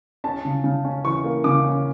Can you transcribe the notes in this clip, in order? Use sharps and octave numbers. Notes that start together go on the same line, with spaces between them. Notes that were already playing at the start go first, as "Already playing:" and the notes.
C#4 A5
C#3
C#3
C#4
E3 C#6
A#3
C#3 D6
C#4